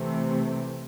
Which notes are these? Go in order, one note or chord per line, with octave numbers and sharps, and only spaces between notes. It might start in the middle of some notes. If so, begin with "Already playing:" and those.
Already playing: C3 E3 A3 C4